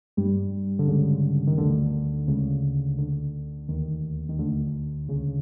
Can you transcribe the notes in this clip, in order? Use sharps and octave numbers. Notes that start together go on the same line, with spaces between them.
G2 G3
D3
C#2 C#3
D#3
D2 D3
C#2 C#3
D2 D3
D#2 D#3
D#3
D2 D3
C#2 C#3